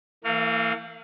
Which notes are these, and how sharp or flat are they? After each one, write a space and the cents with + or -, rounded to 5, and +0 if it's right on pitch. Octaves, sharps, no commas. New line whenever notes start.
E3 +0 A#3 -45 F5 +0